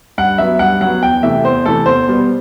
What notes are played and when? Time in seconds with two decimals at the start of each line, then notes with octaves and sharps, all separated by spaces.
0.18 G2 F#5
0.38 F#3 B3 E5
0.59 G2 F#5
0.81 F#3 B3 F#5
1.01 E2 G5
1.23 C3 E3 A3 E5
1.44 E2 C5
1.65 C3 E3 A3 A4
1.86 E2 C5
2.08 B2 G3 B3